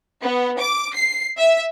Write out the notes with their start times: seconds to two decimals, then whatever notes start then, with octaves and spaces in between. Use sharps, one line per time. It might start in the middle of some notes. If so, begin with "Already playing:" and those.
0.23 B3
0.59 D6
0.94 C7
1.37 E5